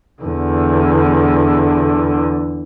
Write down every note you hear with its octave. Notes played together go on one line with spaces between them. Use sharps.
E2 D3